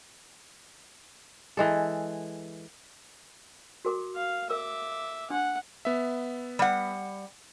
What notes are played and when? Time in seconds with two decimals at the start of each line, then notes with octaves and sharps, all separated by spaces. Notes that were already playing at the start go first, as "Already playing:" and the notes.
1.57 E3 G#3 A4
3.85 F#4 A#4 D6
4.15 F5
4.50 A#4 E5 D6 E6
5.30 D4 F#5
5.85 B3 E5
6.59 G3 F#5